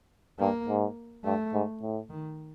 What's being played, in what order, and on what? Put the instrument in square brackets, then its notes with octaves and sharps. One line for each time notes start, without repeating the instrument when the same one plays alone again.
[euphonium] G2 [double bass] A#3
[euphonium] G#2
[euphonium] G2 [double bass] A3
[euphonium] G#2
A2
[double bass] D#3